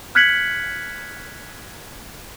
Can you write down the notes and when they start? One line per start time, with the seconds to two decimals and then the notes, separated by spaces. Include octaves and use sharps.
0.15 F6 F#6 G#6 B6 C#7 F#7